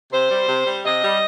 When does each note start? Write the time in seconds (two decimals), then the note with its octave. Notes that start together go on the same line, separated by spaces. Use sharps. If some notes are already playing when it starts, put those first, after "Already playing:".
0.12 C3 C5
0.31 G3
0.48 C3
0.66 G3
0.85 C3 D#5
1.03 G3